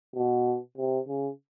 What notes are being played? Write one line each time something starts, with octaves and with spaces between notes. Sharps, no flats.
B2
C3
C#3